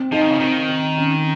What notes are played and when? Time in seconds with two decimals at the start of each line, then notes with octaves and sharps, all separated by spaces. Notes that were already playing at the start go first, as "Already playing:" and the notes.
Already playing: C4
0.12 F3 D#4
0.22 D#3
0.31 C#3
0.40 D#3 C4
0.69 C4
0.97 C#4